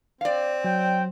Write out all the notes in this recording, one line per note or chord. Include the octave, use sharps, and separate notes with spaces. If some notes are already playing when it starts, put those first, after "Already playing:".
C4 D5 F5
F#3 G5